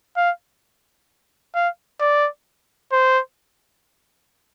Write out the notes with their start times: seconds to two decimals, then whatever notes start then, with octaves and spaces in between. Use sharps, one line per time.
0.17 F5
1.55 F5
2.00 D5
2.92 C5